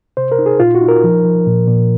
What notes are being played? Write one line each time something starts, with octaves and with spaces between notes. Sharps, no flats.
C3 C5
A#4
D#4
G#4
A#2 F4
F#4
D#4
A#4
F3
F3
A#2
A#2